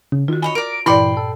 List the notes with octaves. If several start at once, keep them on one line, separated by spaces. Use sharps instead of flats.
C#3
D#3 F4 F#4
C#5 D#5 G#5 B5
A#4 D5 D7
G2 A#2 E3 D5 G5 B5 C6
A4